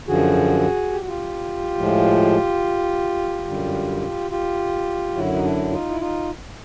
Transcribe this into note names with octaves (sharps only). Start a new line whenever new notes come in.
F#2 D3 F3 F#4 G#4
G4
F#4
F4 G4
A2 F3 G#3
F#2 D3 G3
F4 G4
F#2 D3 F#3 E4 F#4
D#4
D4 E4
D#4 F4
E4
D#4 F4